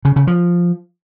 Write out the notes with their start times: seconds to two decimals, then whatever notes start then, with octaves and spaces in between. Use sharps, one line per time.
0.05 C#3
0.16 C#3
0.27 F3